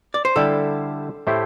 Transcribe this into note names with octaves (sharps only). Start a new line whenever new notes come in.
D5
C5
D3 G3 E4 G4 A4
A2 A3 E4 G4 C5